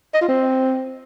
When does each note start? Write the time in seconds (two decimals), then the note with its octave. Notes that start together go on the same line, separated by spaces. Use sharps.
0.14 D#5
0.21 F4
0.28 C4